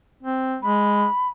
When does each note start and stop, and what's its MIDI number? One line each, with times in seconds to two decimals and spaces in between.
0.23 0.56 60
0.63 1.06 56
0.63 1.28 83